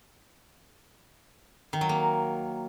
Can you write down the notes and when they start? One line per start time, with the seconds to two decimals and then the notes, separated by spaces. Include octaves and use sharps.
1.73 D#3
1.81 F#3
1.89 A#3